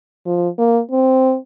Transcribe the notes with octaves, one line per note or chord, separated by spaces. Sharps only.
F3
A#3
C4